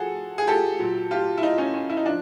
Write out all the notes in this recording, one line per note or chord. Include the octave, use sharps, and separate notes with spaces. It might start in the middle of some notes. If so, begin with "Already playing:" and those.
Already playing: F3 F#4 G#4 A4
G#4
G4 A4
A#2 F#3
F4 G4
E4
D#4 F4
C#4 D#4
C#4
E4
D#4
F3 D4